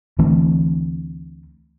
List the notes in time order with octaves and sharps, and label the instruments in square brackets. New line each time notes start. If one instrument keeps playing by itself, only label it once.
[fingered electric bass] D2 E3 A3 C4